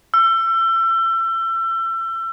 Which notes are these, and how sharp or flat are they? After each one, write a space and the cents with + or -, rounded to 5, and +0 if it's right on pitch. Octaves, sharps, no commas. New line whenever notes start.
E6 +30